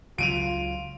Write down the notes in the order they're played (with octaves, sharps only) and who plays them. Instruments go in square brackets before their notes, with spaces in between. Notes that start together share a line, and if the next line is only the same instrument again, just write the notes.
[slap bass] C#2 F#3 [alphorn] F4 [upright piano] D7 D#7 F7